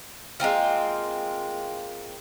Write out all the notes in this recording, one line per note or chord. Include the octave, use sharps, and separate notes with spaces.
G#3 A#3 C4 F4